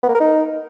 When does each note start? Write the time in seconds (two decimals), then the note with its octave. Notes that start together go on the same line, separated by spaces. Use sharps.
0.03 B3
0.09 A#3
0.15 A#4
0.20 D#4